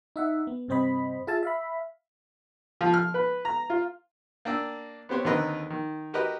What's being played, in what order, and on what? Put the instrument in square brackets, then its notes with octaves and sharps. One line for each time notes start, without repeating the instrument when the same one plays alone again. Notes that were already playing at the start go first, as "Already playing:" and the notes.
[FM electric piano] D#4 E5 F#5
B3
G2 C3 C4 C5 D#5 B5
F4 G#4 E5 F5 G#5 A5
E5 F5 B5
[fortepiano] F3
F6
B4
A#5
F4
A#3 D4 G5 E6
B3 C4 G4 C5 C#5
D#2 D3 C4 A#4 B4 D#5
D#3
F#4 G4 A#4 B4 D#5